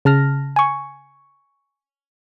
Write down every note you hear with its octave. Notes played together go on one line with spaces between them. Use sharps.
C#3 A5 F6 A#6
G#5 C#6